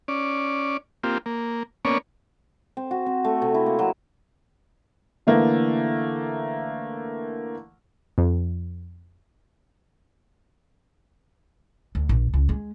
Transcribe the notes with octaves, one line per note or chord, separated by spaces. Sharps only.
C#4 D5
A#3 C4 F4 G4
A#3
A#3 B3 C#4 C#5 D5
C4
F#4
C4
A3
C3
E4
A#3
F#3
D3 E3 A3 A#3
F2
D2
A#1
C#2
G#3